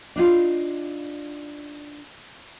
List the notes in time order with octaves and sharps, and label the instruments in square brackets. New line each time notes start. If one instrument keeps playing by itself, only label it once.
[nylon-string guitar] D4 D#4 F4